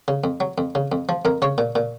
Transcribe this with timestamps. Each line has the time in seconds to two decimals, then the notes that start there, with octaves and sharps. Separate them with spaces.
0.08 C#3
0.24 F2
0.40 F#3
0.58 F2
0.75 C#3
0.92 F2
1.09 F3
1.25 F2 A#4
1.42 C#3 C#5
1.58 A#2
1.75 A#2